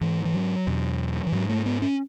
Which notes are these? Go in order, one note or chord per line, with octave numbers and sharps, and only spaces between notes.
G#2 E3
E3
F#3
E2 B2
E3
G#2 F#3
A3
B3
C#4